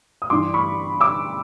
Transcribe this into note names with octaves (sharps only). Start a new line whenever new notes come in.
D#6
G2 E3 G3 C6 D6
B5 C#6
D6 E6